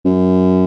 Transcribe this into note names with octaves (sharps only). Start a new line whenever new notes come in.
F#2